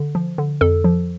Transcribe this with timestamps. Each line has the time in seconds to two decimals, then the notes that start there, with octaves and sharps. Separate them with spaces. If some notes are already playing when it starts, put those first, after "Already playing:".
Already playing: D3
0.15 F3
0.38 D3
0.61 F2 A4
0.84 F3